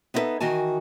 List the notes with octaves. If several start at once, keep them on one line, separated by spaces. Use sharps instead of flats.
B3 D#4 E4 A4 B4 E5
D#3 E3 F#4 G#5 A5